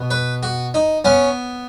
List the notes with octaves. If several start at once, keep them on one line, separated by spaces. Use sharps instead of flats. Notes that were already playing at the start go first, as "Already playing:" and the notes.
Already playing: B2 B3
B4
F#4
D#4
B3 C#4